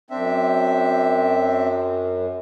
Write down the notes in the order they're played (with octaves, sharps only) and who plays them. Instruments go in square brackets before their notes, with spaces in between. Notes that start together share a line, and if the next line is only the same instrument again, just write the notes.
[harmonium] F#2 [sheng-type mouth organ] C4 D4 E5